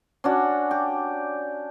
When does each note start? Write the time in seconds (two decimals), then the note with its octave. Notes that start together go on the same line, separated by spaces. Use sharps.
0.24 C#4 D4 F#4
0.71 G4